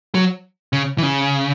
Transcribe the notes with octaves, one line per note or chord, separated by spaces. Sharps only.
F#3
C#3
E3
C#3